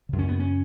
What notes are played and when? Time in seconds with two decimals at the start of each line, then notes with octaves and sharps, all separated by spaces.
0.09 F#2 C#3
0.19 C#4
0.29 B3
0.39 C#4